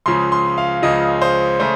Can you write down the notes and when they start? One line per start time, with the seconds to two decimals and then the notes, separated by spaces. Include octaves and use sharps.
0.06 C#2 C#3 F3 C6
0.32 C6
0.58 F5
0.82 C#2 C#3 F3 D#5
1.22 C5
1.59 C#3 A3 C5